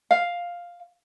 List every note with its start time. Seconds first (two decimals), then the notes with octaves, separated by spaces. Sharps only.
0.11 F5